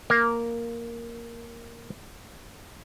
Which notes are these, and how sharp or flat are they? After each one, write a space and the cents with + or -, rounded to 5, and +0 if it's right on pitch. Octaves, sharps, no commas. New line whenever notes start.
A#3 +0 A#4 +0